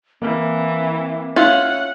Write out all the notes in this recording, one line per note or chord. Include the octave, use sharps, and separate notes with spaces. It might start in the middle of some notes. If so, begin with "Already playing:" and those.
E3 A#3 C4
C#4 E4 F4 F#5